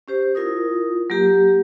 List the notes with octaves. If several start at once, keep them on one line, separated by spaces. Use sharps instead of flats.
C#4 G4 C5
E4 F4 A#4 D#6
F#3 A#3 G4